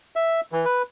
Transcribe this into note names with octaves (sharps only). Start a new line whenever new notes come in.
E5
E3
B4